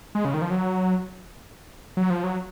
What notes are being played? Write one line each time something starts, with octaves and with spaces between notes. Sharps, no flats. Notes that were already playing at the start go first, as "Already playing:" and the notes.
G#3
C#3
D#3
F3
F#3
F#3
F3
F#3